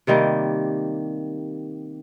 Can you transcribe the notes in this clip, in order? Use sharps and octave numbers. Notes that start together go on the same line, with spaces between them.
C3 D#3 G3 A#3